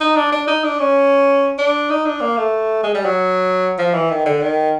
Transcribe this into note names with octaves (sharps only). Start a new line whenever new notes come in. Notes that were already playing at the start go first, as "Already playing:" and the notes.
D#4
D4
D4
D#4
D4
C#4
D4
D#4
D4
A#3
A3
G#3
G3
F#3
F3
E3
D#3
D3
D#3